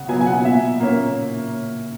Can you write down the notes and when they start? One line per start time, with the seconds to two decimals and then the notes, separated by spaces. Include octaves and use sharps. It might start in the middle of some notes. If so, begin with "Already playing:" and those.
Already playing: C#3 F#5
0.08 F#3 B3 G#5
0.21 G#5
0.26 F#5
0.44 A#2 E5
0.80 A#3 C#4